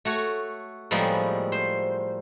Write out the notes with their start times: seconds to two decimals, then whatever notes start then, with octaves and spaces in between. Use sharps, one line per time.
0.05 A3 F#4 C#5
0.91 A2 F3 G3 G#3 A#3 B3
1.52 C5